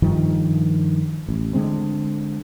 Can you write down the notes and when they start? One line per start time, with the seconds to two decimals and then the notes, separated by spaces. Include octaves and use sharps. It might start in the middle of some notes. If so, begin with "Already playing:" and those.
0.02 G2 D#3 F3
1.29 A1
1.54 D3 G#3 C4